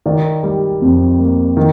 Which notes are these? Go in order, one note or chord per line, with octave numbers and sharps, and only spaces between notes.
D#3 D5
G3
F2
A#3
D#3